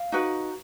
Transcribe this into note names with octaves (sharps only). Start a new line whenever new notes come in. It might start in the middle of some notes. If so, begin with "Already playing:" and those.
Already playing: F5
D#4 F#4 B4